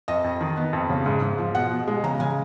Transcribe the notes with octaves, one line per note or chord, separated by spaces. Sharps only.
F2 D#5
F2
D#3
B3
F2
C#3
G#2
G#2
F3
B2 F#5
B2
G#3
C#3 A#5
C#3 G#5